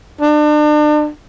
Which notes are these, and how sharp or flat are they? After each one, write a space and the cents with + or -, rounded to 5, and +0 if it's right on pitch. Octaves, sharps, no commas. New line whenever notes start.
D4 +35